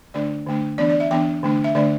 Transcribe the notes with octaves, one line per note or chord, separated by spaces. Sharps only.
D3 A3 D4 D5
D3 A3 D4
E3 B3 D4 D5
D5
E5
E3 B3 D4 G5
D3 A3 D4
E5
D3 A3 D4 D5